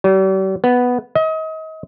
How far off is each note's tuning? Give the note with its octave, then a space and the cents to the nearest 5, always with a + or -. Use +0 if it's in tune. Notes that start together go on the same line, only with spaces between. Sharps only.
G3 -45
B3 +0
D#5 +35